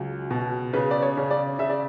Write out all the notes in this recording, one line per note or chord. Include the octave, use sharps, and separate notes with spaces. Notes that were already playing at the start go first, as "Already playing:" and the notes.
Already playing: C#2 F#3
B2
C#3 B4
D5
C#5
C#3
D5
C#3 E5
D5